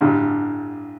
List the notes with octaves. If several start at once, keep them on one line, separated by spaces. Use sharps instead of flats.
A1 G2 D3 G3